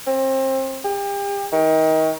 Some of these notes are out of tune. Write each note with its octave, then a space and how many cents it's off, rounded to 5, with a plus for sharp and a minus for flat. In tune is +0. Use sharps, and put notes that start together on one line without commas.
C4 +30
G4 +35
D#3 +30